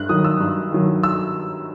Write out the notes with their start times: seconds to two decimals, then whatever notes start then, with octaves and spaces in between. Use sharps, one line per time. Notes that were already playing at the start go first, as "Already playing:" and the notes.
Already playing: G2 F#6
0.09 D#3 F#3 D#6
0.25 E6
0.40 G2
0.72 D#3 F#3
1.03 E6